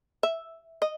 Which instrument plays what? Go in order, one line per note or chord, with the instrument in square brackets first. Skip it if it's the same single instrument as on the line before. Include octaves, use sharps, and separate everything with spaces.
[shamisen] E5
D#5